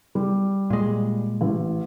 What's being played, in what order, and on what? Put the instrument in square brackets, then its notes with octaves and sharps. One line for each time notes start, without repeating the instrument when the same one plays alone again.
[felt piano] G3
[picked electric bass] A#2 G#3
[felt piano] A1